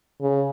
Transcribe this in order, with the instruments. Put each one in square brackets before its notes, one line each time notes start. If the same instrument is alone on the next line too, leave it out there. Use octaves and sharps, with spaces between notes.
[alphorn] C#3